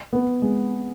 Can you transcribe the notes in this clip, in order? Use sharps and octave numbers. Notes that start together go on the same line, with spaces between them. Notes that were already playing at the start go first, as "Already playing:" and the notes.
B3
G#3